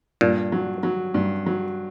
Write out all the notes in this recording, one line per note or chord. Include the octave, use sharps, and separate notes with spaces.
G2 A#2
F#3
F#3
G2
F#3